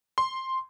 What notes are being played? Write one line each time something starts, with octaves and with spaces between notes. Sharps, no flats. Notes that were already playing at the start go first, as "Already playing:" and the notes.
C6